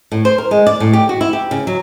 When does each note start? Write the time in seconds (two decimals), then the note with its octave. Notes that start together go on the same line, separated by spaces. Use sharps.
0.12 A2
0.25 C5
0.38 A#4
0.51 G#3
0.67 D5
0.80 A2
0.93 G4
1.09 F#4
1.21 E4
1.33 G4
1.51 C#3
1.67 F#3